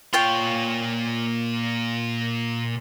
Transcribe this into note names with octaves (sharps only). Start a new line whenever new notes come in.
A#2 F4 C#5 G5 C6